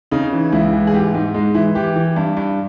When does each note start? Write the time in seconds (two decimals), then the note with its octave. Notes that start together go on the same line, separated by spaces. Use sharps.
0.11 C#3 D#4
0.33 E3
0.52 C#2 E4
0.73 E3
0.87 G#4
0.93 G#2 G4
1.14 G#2 D#4
1.34 G#3 D#4
1.54 E3 E4
1.75 E3 G4
1.96 E3
2.16 G2
2.37 G2